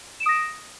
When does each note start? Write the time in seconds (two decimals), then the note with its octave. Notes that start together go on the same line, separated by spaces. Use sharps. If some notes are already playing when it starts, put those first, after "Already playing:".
0.20 E7
0.23 D7
0.26 D#6
0.29 A#6